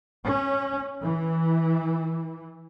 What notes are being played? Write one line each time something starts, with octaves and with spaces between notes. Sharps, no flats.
C#4
E3